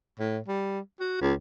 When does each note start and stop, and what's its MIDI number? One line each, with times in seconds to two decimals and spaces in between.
0.19 0.38 45
0.48 0.80 55
1.00 1.17 66
1.21 1.33 37